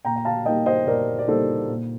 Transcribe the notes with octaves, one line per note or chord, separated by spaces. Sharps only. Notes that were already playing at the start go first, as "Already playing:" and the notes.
A#2 G5 A#5
G5
F5 A5
G3 A#3 D#4 D#5 G5
C5 D#5
A#2 A#4 D5
D5
G3 A#3 D#4 A4 C5
A#2